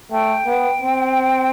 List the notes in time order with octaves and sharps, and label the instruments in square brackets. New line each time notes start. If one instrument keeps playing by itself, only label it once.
[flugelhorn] A3 [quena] G5
[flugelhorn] B3
C4